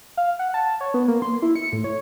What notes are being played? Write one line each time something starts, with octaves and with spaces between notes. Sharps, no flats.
F5
F#5
A5
C#5
B3
A#3
C6
E4
C#7
A2
C#5